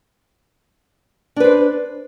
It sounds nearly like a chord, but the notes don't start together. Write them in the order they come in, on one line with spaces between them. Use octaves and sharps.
D4 B4 C5